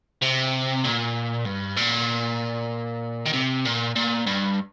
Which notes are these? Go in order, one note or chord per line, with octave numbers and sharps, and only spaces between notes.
C3
A#2
G2
A#2
D#3
C3
A#2
A#2
G2